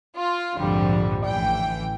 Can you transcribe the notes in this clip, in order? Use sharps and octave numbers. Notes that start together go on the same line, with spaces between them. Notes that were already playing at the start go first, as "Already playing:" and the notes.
F4
A#1 F2 G#2 D3 G3
A1 E3 G5